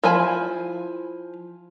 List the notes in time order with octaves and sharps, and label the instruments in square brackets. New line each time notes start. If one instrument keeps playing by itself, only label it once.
[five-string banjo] F3 E4 G#5